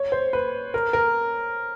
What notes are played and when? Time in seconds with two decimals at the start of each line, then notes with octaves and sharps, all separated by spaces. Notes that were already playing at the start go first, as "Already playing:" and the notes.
Already playing: C#5
0.12 C5
0.33 B4
0.74 A#4
0.93 A#4